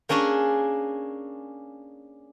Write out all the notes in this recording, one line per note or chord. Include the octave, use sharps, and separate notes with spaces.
A#3 C#4 D4 G#4 C#5